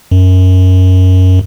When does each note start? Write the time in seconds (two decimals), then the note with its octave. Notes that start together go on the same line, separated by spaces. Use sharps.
0.11 F#2